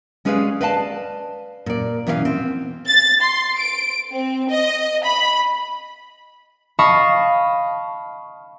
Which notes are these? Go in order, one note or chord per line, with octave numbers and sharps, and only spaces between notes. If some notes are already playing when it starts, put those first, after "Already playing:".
G#3 C#4 G#4 B4 D5 F5
B4 D5 D#5 F5 G#5 A5
A#2 D5
B2 E3 C#4 C#5 F5
C4
A6
C6
D7
C4
D#5
B5
D#5 F5 A5 B5 C#6 D#6